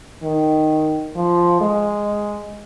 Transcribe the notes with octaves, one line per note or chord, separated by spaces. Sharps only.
D#3
F3
G#3